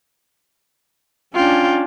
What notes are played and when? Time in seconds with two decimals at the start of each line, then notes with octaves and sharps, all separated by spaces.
1.34 C#4 D4 F4 G5